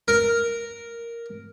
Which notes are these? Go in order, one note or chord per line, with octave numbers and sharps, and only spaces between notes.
A#4